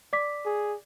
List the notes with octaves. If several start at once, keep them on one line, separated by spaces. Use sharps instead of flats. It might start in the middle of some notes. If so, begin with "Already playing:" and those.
D5 D6 B6
G#4